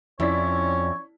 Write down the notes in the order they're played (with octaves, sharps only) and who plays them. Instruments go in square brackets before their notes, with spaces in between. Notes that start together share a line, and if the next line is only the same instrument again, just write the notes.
[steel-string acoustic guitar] F2 [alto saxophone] C#4 [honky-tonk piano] E4 D5 B6 [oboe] C#5